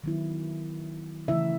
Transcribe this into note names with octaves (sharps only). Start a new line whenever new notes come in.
D#3 F#3 B3 E4
C#3 E3 A3 E4 E5